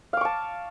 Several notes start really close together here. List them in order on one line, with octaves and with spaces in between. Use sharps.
F5 D6 C#6 A5